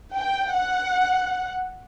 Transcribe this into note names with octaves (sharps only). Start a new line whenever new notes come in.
G5
F#5